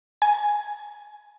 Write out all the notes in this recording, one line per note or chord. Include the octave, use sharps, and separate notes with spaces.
G#5